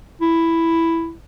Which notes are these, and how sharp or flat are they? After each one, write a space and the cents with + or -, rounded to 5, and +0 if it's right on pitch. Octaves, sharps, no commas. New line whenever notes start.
E4 +5